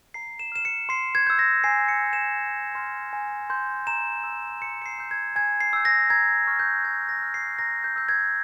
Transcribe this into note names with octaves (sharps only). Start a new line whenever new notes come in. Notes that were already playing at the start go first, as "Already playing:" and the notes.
A#5 C7
E7
F6 E7
C#7
C6 C7
G#6
E6 G6
A#6
G#5 C7
C#7
C6 E6
E7
G#5
C6 F6
G#5
C6 G6
A#5 E7
E6 G6
C6 C#7
C#7
C7
E6 G6
G#6
G#5 G#6
C7
E6 G6
A#6
A#5 G#6
C#6 F6
G6
A#5 G#6
A#6
F6
C7
A#5 A#6
G6
E6 G6
G#6